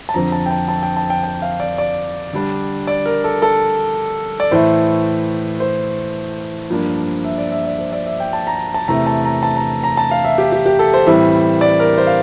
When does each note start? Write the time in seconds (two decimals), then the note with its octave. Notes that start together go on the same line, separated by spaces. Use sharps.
0.09 A5
0.14 F2 D3 F3 C4 A#5
0.32 A5
0.46 G5
0.51 A5
0.68 A5
0.83 G5
0.97 A5
1.10 G5
1.24 G5
1.42 F5
1.60 D5
1.78 D5
2.33 D3 G3 D4
2.87 D5
3.05 A#4
3.24 A4
3.42 A4
4.40 D5
4.51 A2 E3 A3 C5
5.60 C5
6.70 G2 F3 A#3 D4
7.25 E5
7.38 D5
7.52 E5
7.65 D5
7.79 C5
7.93 D5
8.07 E5
8.20 G5
8.33 A5
8.47 A#5
8.74 A5
8.88 E2 C3 E3 A3 A#5
9.07 A5
9.25 A#5
9.43 A5
9.56 A#5
9.83 A#5
9.97 A5
10.11 F5
10.25 E5
10.38 G4
10.52 G4
10.66 G4
10.79 A4
10.94 C5
11.07 A2 E3 G3 C4 E5
11.61 D5
11.80 A#4
11.98 C5
12.07 F5